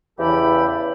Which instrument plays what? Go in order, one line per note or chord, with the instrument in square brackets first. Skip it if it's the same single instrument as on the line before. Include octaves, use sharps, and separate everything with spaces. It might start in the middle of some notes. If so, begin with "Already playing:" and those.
[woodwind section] E2 C#3 E3 G4 A4 B5